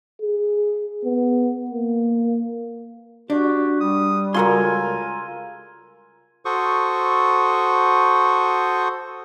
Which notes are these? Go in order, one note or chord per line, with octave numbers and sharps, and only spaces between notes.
G#4
B3
A#3
D4 F#4 G4
G3 D#6
C#2 F4 F#4 A4 A#4 G#5 C6
F#4 A4 C5 C#6 D#6